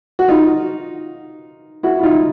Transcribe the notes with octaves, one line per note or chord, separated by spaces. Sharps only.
F#4
D#4 F4
E4 F#4
E4
D#4 F4